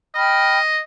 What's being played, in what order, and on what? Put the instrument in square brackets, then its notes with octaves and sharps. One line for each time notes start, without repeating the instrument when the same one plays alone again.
[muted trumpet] D#5 [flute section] G5 B5 F6